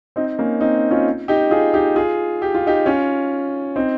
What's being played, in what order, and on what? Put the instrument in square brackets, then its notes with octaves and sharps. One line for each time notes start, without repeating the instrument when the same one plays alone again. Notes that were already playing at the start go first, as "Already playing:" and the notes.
[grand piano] C4 D#4
A#3 C#4
C4 D#4
C#4 F4
D#4 G4
F4 G#4
D#4 G4
F4 G#4
G4
F4
D#4 G4
C#4 F4
C4 D#4